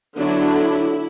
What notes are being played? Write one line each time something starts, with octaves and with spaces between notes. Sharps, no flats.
D3 F#3 B3 D4 E4